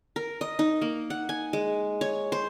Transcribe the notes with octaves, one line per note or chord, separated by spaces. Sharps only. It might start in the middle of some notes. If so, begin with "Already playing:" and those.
A#4
D#5
D#4
A#3
F#5
G#5
G#3
C#5
C5